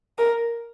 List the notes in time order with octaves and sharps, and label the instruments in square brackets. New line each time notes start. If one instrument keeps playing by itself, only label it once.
[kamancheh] A#4